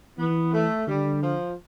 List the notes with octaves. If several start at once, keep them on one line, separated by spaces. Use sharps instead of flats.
E3 B3
A3
D3 G3
F3